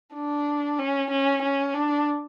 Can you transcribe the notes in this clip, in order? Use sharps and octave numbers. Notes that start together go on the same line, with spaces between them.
D4
C#4
C#4
C#4
D4